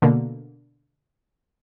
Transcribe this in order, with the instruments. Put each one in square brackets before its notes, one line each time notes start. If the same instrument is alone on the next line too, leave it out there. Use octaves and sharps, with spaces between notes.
[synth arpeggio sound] B2 D3 A#3